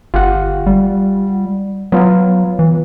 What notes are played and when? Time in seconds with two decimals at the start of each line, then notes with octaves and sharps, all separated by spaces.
0.14 G1 F4 G4 F#5
0.67 G3
1.92 F#3 B3 F4
2.59 E3